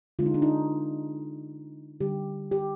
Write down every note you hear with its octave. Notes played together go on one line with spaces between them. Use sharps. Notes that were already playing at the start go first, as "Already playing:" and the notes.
D3 G#3 F4
D#4
D4
D#4
D3 G3 G4
G4